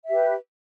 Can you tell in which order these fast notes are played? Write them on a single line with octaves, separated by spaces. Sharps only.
E5 G4 B4